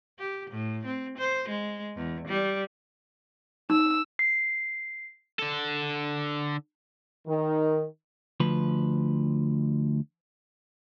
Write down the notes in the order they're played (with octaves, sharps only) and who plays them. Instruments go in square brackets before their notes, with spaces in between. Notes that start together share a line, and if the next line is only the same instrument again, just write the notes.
[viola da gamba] G4
A2
C4
C5
G#3
E2
G3
[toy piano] D#4 [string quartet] E6
[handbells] C7
[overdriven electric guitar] D3 A4
[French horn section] D#3
[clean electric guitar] D2 F3 B4